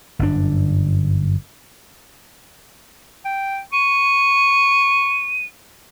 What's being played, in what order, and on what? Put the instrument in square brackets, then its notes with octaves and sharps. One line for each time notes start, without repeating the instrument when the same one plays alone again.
[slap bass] G1 F#2 D4
[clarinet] G5
[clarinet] C#6 [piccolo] D#7